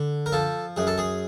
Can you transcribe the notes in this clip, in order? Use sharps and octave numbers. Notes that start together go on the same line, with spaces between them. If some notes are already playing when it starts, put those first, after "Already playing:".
Already playing: D3
A#4
F3 A4
F#2 G#4
A4
G#4